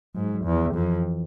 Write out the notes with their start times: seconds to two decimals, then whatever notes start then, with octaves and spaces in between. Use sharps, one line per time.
0.15 G#2 F#3
0.35 F#3
0.44 E2 F3
0.66 D#3
0.74 F2 E3